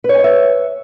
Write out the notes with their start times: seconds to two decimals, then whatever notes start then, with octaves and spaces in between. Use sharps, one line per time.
0.04 B4
0.09 C#5
0.14 G#5
0.19 D#5
0.24 E5